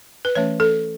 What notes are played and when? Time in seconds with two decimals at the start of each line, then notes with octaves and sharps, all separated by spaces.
0.25 B4
0.35 E3 A3 C#4 C#5
0.60 A4